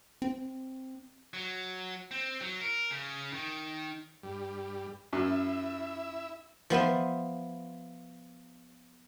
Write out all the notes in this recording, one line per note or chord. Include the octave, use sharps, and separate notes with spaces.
C4
F#3
C4
F#3
A#4
C#3
D#3
G2 G3
F#2 E4 E5
F3 B3 E5 C6